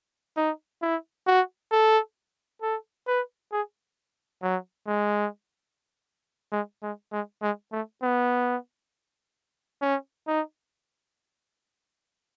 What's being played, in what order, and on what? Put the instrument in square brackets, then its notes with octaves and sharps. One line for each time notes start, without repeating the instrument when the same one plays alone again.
[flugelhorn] D#4
E4
F#4
A4
A4
B4
G#4
F#3
G#3
G#3
G#3
G#3
G#3
A3
B3
C#4
D#4